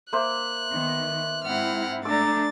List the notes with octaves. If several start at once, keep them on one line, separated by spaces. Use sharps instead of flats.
A#3 C5 E5 F#6
D#3 B3
G#2 C4 E4 F#5 F6
A3 D4 A#5 D6 E6 A6